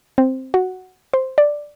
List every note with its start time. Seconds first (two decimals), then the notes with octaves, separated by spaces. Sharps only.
0.18 C4
0.54 F#4
1.14 C5
1.38 D5